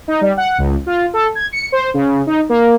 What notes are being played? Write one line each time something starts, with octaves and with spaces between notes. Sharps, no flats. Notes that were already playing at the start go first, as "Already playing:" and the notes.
D#4
G3
F#5
C#2
F4
A4
G#6
C#7
C5
C#3
D#4
A#3